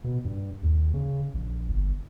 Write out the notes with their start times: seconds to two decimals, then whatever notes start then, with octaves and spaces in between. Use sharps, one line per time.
0.04 B2
0.25 G2
0.63 D#2
0.94 C#3
1.34 A#1
1.69 G1